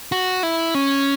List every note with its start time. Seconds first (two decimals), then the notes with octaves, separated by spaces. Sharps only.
0.12 F#4
0.43 E4
0.75 C#4